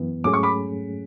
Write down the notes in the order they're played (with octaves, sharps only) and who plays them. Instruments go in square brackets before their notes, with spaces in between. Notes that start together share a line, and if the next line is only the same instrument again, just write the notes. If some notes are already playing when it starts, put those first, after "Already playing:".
Already playing: [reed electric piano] F#2 E3 B3
[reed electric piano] G#2 F#3 A3 C#4 G#4 [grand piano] D6
[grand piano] C#6
B5 D6